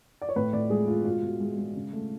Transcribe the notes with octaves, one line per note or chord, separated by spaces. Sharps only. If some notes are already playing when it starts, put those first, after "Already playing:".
D5
C#5
A2 B4
A2 D5
G#3 G#4
G#3 F4
B2 F4
B2
G#3
G#3
C#3
A3